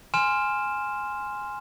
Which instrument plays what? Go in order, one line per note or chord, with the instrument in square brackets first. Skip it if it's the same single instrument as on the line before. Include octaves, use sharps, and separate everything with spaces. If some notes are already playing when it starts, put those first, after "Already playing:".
[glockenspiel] G#5 C6 F6 E7